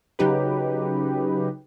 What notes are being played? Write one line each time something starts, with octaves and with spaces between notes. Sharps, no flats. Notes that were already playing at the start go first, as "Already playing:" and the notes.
C#3 F#3 D#4 G4 B4